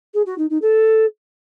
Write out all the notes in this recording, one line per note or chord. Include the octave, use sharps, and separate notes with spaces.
G#4
F#4
D#4
D#4
A4